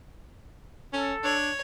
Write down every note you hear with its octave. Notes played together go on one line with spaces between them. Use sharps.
C#4 A4
D4 C#5